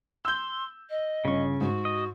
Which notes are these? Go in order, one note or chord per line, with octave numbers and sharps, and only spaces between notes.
C6 E6 G6
D#5
G1 C#3 C#4 C#6
G#2 F#4
D#5